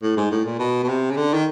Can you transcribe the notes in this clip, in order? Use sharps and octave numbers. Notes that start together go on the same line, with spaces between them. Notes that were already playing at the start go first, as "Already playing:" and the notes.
A2
G#2
A2
A#2
B2
B2
C3
C#3
D3
D#3